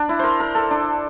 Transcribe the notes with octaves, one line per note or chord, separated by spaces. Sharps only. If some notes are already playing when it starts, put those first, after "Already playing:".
Already playing: D4
E4
A#4 C5
A#4
A4
D4